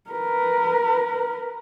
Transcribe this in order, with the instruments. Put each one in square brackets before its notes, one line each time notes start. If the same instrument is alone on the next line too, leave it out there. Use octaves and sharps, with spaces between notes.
[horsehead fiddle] A#4 B4